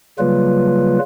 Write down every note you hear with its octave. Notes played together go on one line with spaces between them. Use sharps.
C#3 F#3 G3 A#3 F4 B4